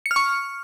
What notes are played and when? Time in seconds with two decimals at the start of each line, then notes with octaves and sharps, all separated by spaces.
0.06 C#7
0.11 F6
0.16 C#6